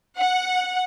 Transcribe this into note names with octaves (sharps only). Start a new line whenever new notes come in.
F#5